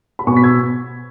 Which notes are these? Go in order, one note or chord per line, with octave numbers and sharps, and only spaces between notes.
B5
B2 B3 G#5 C#6
B6
E6 G#6